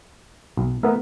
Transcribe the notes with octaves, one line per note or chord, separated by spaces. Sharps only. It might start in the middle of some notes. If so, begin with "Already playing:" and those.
B1
A3 B3 A#4 E5